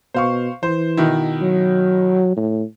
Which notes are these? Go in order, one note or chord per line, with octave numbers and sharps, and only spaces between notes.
B2 C5 F5 C#6
E3 C5
B2 D#3 E4
F#3
A2